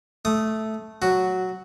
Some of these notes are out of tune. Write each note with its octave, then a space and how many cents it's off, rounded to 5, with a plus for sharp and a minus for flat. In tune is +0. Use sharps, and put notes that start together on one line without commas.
A3 -5 D#6 +0
F#3 +0 F#4 +0